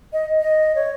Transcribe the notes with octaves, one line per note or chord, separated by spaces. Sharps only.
D#5
D#5
C#5